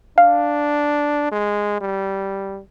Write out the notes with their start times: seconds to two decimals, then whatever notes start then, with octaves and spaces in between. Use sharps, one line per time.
0.18 D4 F5
1.32 G#3
1.81 G3